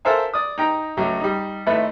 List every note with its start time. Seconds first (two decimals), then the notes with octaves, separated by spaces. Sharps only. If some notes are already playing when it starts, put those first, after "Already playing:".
0.05 A4 A#4 C5 E5 F5 G#5
0.34 D5 D#6
0.58 D#4 G5 A#5
0.97 C#2 F#3 A3
1.20 G3 D#4
1.67 G#1 A3 E4 B4